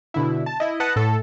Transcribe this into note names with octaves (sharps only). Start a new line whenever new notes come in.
B2 D3 E4
A5
E4 D#5
B4 D#5 F#5 A5
A2 A4